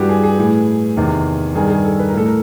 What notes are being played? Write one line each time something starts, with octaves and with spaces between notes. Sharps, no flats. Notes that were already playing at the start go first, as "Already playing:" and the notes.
Already playing: G2 E3 F#4 G4
G#4
G#4
A2 E3
E2 C3 D#3
G2 D#3 G#4
G#4
A4
B4
A#4
A2 E3 A4
A#4